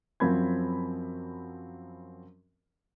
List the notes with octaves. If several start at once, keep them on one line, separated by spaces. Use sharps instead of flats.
F#2 F3 F#3 C4 B5 G#6